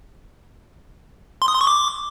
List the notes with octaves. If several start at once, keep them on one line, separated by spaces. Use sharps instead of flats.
C6
D#6
C6
C#6
D6